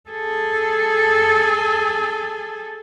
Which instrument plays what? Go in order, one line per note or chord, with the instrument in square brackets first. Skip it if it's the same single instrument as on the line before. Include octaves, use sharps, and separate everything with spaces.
[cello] G#4 A4